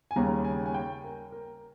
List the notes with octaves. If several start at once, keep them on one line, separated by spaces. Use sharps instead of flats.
G#5
D#2 C#3 G3 A#5
G#5
G#5
G5
A#4
A#4